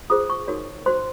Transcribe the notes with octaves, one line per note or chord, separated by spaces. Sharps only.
F4 G#4 C5 D#6
C#6
D#4 F#4 A#4 C#5
F#4 C5 C6